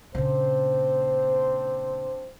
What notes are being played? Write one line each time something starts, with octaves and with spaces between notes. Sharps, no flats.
A#2 C#3 C4 D4 C5